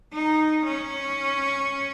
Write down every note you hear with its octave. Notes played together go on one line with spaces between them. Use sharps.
D#4
C#4